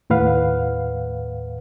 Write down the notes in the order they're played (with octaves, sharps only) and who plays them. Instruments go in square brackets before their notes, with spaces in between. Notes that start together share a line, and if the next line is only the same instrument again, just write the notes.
[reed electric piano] D#2 A2 B4 F5 F#5